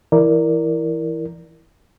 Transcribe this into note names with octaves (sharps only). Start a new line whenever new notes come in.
E3 E4 A#4 D5